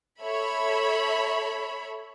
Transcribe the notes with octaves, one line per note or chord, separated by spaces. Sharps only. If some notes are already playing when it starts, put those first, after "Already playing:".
A4 C#5 E5 B5